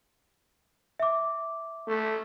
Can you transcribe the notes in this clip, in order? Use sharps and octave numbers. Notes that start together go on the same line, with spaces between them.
E5 D6
A3